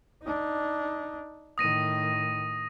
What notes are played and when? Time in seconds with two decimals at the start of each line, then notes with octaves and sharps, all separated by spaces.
0.22 D4 D#4
1.58 A2 D#3 D#6 A#6 D#7